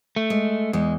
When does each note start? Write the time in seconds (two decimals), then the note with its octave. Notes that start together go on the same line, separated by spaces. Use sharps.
0.16 A3
0.30 G#3
0.73 E2 G#3